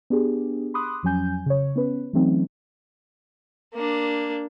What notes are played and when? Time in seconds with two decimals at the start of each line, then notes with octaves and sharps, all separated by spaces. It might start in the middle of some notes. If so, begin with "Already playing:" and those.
0.10 B3 D4 G4 G#4
0.74 B5 C6 D6 D#6 F#6
1.03 F2 F3 F#3 C#4 G#5 G6
1.46 C#3 C#5
1.76 B3 C#4 B4
2.13 E3 F#3 A3 C4 C#4 D#4
3.74 A#3 D4